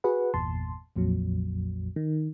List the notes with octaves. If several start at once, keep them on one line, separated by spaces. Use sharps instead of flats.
F#4 G#4 B4 F#5
G1 E2 A#2 A5 C6
A#1 F2 A#2 F#3
D#3